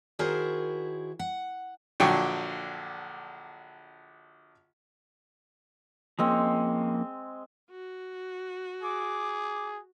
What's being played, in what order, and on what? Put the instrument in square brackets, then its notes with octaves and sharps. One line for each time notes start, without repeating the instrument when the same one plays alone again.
[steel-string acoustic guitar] D#3 E4 F#4 G#4 A#4 C5
F#5
[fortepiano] A#1 D3 F#3 G5 C#6
[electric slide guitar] F3 A#3 C#4 [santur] G#3 C4
[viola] F#4
[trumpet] G#4 [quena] D6